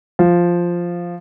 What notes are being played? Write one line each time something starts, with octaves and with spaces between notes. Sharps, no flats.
F3